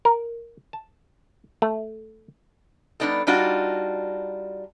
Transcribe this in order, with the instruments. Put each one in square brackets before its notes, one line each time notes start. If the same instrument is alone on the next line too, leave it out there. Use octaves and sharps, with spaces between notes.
[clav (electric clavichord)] A#4
A5
A3
[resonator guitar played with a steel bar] G3 B3 D4 D#4 A4
G3 D4 D#4 F4 F#4